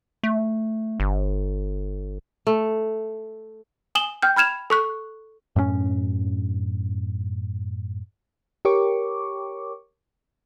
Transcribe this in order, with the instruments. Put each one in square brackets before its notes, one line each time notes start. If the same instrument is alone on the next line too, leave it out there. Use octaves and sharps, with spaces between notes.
[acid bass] A3
G1
[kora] A3
[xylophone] G#5 D#6 E7 F#7 G7
G5 F6 G6
B5 F6 G#6 E7 F7
A4 C#6 F#6
[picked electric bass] F#2 A2 A3 C#4
[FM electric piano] G4 A#4 C#5 C#6 D6